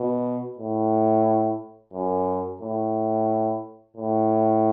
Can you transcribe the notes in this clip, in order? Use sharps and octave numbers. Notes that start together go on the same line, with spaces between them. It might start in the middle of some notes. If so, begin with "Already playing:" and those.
Already playing: B2
A2
F#2
A2
A2